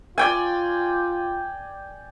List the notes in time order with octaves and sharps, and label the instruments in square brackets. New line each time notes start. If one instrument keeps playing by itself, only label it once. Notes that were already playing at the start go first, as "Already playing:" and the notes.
[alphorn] F4 [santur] D5 G5 G#5